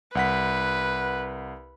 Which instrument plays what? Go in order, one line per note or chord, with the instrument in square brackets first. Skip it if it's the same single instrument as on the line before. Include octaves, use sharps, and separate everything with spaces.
[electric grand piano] C2 F#5 B6 [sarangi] B4